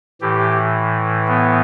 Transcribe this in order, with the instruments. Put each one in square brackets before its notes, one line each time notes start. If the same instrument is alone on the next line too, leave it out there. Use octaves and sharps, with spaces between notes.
[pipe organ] A2 E3 G4
B3